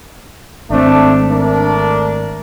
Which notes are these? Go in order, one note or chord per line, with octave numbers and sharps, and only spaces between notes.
G#1 A3 C4 D4
A3 D4 A#4